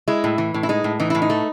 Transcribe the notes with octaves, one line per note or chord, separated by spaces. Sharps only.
G#3 E4
A2
E3
A2
E4
G#3 D#4
A2
E3 D#4
A2 E4
D#4
A3